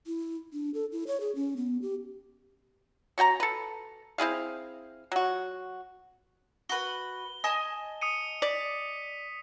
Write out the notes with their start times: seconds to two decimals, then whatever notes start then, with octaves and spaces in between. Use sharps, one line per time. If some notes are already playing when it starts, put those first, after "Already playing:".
0.07 E4
0.53 D4
0.74 A4
0.92 E4
1.07 C#5
1.20 G#4
1.35 C#4
1.56 B3
1.82 G4
3.18 C#4 F#4 G5 A#5
3.40 A4 B4
4.18 C4 E4 G#4 F5
5.12 F#3 F#4
6.69 F#4 B4 G7
7.44 D#5 G#5 A5
8.02 D#6 C#7 D#7
8.42 D5 B6